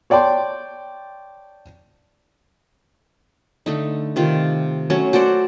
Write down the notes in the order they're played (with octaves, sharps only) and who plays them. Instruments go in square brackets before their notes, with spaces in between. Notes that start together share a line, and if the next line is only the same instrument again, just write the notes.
[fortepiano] C#5 D5 G5 A5 C6
[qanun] D3 A3 D#4
C3 D#3 F4
F#3 A3 C#4
F#4 A4 C5 D5